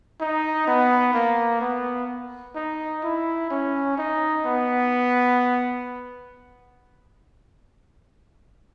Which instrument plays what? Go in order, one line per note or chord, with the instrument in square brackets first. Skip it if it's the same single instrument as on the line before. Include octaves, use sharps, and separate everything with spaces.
[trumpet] D#4
B3
A#3
B3
D#4
E4
C#4
D#4
B3